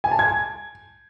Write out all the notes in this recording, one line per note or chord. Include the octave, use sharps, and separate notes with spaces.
G#5
A5
G#6